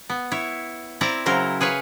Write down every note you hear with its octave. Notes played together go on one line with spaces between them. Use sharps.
B3
E4 C#5
C4 E4 D5 A#5
C#3 F#3 E4 A#4 C5
G#4 B4 C#5 F5